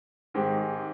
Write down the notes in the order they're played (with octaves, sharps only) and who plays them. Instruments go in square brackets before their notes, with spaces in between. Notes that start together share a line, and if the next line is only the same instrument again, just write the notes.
[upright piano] G#2 D#3 G#3 C4 G4